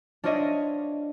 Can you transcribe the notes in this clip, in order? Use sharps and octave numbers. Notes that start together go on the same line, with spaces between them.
D4 F4 C5 C#5 D#5 E5